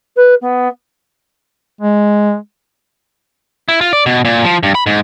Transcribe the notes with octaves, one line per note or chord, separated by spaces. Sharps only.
B4
B3
G#3
E4
F4
D5
B2
A#2
F3
G2
B5
G#2